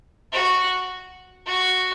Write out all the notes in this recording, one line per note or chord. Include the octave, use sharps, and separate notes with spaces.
F#4
F#4